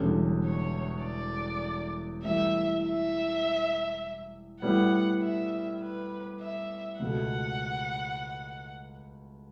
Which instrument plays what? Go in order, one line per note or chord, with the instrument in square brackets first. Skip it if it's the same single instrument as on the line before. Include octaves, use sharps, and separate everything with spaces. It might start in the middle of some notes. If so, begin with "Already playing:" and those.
Already playing: [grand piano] E1 E2 D3 G3 C#4
[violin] C#5
D5
[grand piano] A2 E3 G3 [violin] E5
[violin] E5
[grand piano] A2 G3 B3 [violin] F#5
[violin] E5
B4
E5
[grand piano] C#2 B2 A3 [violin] F#5